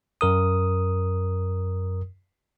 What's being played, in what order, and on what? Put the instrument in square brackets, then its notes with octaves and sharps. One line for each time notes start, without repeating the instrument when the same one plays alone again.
[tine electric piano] F#2 A#4 D#6